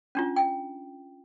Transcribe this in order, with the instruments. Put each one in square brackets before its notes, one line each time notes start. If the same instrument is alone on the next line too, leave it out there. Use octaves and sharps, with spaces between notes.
[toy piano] C#4 D4 F4
G5